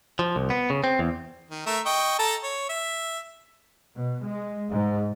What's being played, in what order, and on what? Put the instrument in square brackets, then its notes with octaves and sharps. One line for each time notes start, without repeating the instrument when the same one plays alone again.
[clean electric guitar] F3
C2
B3
C#3
C4
E2
[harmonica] D#3
A3 A#4 E5
D#5 G5 C#6
A4 A5 A#5
C#5
E5
[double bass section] B2
G#3
G#2